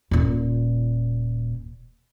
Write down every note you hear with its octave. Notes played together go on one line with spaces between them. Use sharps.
D#1 A#2